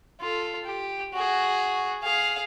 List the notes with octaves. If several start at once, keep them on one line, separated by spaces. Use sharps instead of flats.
F4 A4
G4
F#4 G#4
G#4 F5